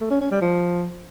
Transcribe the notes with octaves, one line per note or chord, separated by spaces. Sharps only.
A3
C#4
C#4
G3
F3